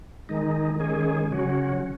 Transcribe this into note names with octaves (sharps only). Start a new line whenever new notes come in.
D#3 G#3 D#4
D#3 G#3 C#4 G#4
C#3 F#3 C#4 F#4